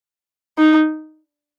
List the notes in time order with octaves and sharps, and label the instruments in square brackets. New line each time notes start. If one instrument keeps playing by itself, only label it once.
[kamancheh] D#4